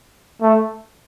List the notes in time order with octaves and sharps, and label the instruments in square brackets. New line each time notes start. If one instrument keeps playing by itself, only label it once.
[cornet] A3